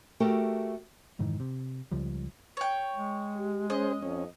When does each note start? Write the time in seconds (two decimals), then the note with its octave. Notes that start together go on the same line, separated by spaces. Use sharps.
0.20 A3 F#4 G4 A4 A#4
1.19 F1 G#2 D#3 E3
1.40 C3
1.92 C#2 F3 G3
2.57 C#5 G5
2.96 G#3
3.38 G4
3.70 C#4 G#4 C5 D#5
4.02 F2 C#4